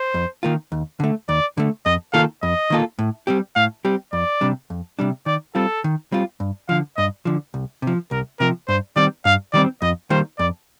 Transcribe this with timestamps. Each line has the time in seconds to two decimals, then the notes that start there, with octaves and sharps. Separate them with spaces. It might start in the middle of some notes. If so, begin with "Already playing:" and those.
Already playing: C5
0.14 F2
0.43 D#3 A#3 F4
0.72 D#2
1.00 D3 A3
1.28 D#2 D5
1.57 D3 A3
1.86 F2 D#5
2.13 D#3 A#3 F4 A4 F5
2.42 F2 D#5
2.70 D#3 A#3 F4 A4
2.99 A2
3.27 G3 C4 G4
3.56 A2 F5
3.85 G3 C4 G4
4.13 F2 D5
4.41 C3 G3 D4
4.70 F2
4.99 C3 G3 D4
5.26 D#3 D5
5.55 G3 C4 F4 A4
5.84 D#3
6.12 G3 C4 F4
6.40 G2
6.69 D3 F3 F5
6.97 G2 D#5
7.25 D3 F3
7.54 C2
7.82 C3 F3
8.11 C2 A#4
8.40 C3 F3 A#4
8.68 G2 C5
8.96 D#3 G3 C4 D5
9.25 G2 F5
9.53 D#3 G3 C4 D5
9.82 F2 D#5
10.10 D#3 G3 A#3 C5
10.39 F2 D5